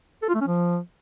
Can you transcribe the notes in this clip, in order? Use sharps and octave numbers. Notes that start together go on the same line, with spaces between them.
A4
F4
A3
C#4
F3